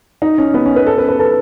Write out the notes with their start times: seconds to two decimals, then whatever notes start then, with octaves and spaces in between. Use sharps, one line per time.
0.22 D#4
0.38 C#4
0.54 B3
0.66 C#4
0.76 B4
0.86 A4
0.98 B4
1.08 B4
1.19 A4